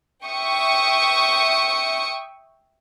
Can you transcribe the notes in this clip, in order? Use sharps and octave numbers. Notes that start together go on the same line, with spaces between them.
E5 G5 C#6 D#6